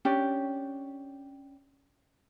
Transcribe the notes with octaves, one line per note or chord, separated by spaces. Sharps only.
C#4 D4 G4